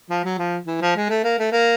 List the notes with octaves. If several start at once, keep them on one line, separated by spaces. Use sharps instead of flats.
F3
F#3
F3
E3
F3
G#3
A3
A#3
A3
A#3